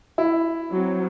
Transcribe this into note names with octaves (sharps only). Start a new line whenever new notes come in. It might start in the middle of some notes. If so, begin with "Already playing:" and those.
E4
F#3 C4